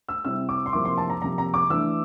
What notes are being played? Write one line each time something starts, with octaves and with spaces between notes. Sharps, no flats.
E6
C3 G3 C4 E4 E6
D6
C6
C3 F3 A#3 E4 D6
C6
A5
A#5
C3 F3 A#3 A#5
A#5
D6
E3 A3 D4 E6